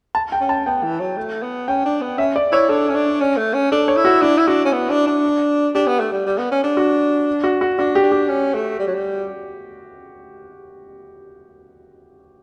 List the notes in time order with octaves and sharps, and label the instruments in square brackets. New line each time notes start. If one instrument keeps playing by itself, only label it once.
[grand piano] A5
G5
[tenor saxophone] C#4
[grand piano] A5
[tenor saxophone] B3 [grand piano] G5
[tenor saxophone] E3
F#3
A3
B3
[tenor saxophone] C#4 [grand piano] G5
[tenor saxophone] D4
B3
[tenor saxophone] C#4 [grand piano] E5
[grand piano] D5
[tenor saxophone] E4 [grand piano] C#5
[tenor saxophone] D4 [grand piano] A4
[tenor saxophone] C#4
D4
C#4
A3
C#4
[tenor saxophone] D4 [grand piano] A4
[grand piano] C#5
[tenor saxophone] E4
[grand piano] F#4
[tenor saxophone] D4 [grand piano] E4
[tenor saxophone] E4
[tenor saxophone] D4 [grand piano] F#4
[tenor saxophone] C#4
B3
D4
D4
[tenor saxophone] D4 [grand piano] G4
[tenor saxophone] B3
A3
G3
G3
B3
C#4
D4
[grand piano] F#4
F#4
F#4
[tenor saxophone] D4 [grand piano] F#4
[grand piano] G4
[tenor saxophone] D4
[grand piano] G4
[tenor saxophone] C#4
A3
G3
F#3
G3